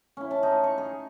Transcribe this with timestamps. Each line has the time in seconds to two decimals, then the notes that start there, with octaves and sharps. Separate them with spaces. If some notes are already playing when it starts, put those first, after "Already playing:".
0.17 C#4 E4
0.31 A5
0.43 D#4
0.64 C#6
0.78 G#4